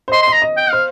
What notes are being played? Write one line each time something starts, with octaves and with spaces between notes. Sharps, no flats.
C5
D#5 C6
C6
D#5 A#5
D#5
G5
C5 F5